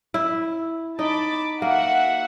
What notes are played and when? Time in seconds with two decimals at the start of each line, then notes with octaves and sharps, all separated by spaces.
0.14 E4
0.99 D#4 A5 B5 D6
1.62 A#3 F#4 E5 F#5